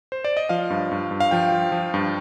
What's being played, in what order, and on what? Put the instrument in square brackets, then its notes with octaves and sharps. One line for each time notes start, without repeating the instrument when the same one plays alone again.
[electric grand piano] C5
D5
D#5
F3 F5
G2
G2
G2
F5
F3 G5
F3
F3
G2